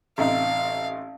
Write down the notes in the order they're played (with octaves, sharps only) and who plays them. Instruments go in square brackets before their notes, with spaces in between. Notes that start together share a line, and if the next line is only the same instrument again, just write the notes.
[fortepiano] A1 C3 D#4 [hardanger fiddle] F5